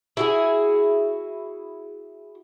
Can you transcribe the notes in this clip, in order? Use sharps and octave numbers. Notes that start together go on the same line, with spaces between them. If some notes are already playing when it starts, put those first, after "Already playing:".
E4 F#4 G#4